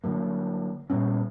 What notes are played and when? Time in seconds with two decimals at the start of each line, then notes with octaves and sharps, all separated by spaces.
0.04 D3 D#3 F#3 A#3
0.90 A#2 G3 B3 C#4